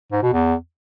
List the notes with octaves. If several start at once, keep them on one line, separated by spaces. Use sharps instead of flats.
G#2
B2
E2